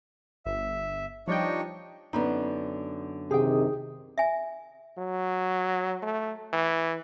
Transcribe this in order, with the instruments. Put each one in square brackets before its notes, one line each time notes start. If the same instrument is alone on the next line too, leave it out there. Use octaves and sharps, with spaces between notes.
[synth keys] G1 [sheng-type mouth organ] E5
[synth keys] F3 G3 G5 [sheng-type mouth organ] D4 D#4 C#5
[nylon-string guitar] F#2 D3 B3 [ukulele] D#4 B5
[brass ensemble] C3 D#3 [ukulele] G4 G5 [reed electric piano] G#4 D#6
[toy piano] E5 G#5
[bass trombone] F#3
A3
E3